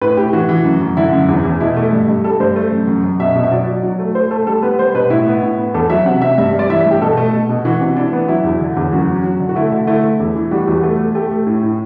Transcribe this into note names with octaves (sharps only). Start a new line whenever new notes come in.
A2 B4
A2 G4
E3 F#4
E3
F#2
F#2
D3 E4
F#2
E2
E2
B2 E4
A3
G2
G2
G3 A4
G2 C5
A3
F#2
F#2
F#2
B2 E5
B2
E5
F#3 D5
F#3
F#3
A3
A3 C5
A3 A4
G3 A4
B3 B4
G3 C5
B2 B4
A2 E4
B3
A2
B3
E2 A4
F#3 E5
C3 F#5
C3 E5
G2 E5
G2
D5
E3 E5
E5
G2
G4
B2 A4
A3
B2
B2
E3 F#4
C3
E3 D4
B3
F#3 E4
E2
D3
E2
F#2 F#4
F#3
F#3
D3
F#4
A3 E4
D3
A3 E4
A3
E2
E3
G3 F#4
E2 F#4
A3
A3
A3 G4
A3
A2
A2